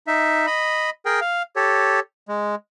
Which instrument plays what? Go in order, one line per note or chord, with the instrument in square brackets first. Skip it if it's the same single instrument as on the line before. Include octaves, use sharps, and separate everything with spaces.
[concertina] D#4 E5
D#5 B5
G#4 A#4 G5
F5
G4 A4 C#5
G#3